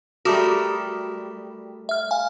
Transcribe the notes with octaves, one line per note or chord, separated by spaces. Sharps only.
G3 A3 F#4 A#4 D6 D#6
E5 F6
F5 G#5